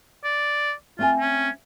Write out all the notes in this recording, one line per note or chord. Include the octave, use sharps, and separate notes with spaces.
D5
A3 C4 F4 G#5
C#4